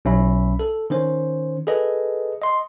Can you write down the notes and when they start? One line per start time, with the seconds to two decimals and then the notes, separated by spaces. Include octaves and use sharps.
0.05 B1 C#4 E5 B5
0.59 A4
0.90 D#3 C#4 C5
1.67 G#4 A4 B4 D#5
2.42 D#5 C6